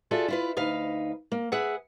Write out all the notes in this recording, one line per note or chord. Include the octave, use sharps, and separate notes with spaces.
F4 F#4 G#4 A4 D5 E5
E4 F4 B4
D2 D#4 B4 F5
A#3
G#4 B4 E5 F#5